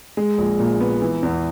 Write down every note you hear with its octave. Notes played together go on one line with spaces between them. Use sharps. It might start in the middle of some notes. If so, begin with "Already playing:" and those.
G#3
A#1
A#2
B3
E3
E2